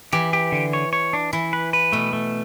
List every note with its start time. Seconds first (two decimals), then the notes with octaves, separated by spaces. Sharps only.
0.12 E3 G4
0.33 G4
0.52 D3
0.73 C#5
0.93 C#5
1.13 D4
1.33 E3 E4
1.53 B4
1.73 B4
1.93 B2 A3
2.13 A3